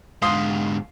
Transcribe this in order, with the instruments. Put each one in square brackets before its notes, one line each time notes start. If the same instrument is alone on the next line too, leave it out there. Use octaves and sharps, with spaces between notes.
[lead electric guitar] G#2 D3 [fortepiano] F5 C6 D#6